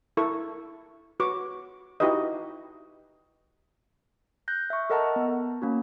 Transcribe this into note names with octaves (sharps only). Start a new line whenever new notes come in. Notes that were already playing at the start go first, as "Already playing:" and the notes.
E4 A4 A#4 C#6
F#4 B4 C#6 D6
D#4 E4 F#4 G4 B4 D#5
F#6 G6 A#6
E5 C#6
A4 A#4 D#5 F#5 A5 A#5
B3
A#3 C#4 F#4